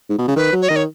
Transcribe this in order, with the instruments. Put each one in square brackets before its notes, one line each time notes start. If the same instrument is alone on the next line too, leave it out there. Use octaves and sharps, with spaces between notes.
[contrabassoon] G#2
B2
C#3
[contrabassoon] D#3 [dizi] B4
[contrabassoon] F#3
[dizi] C#5
[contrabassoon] D#3 [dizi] D#5
[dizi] C#5